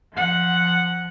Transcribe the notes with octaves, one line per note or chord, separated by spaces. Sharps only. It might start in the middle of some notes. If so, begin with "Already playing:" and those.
F3 F#5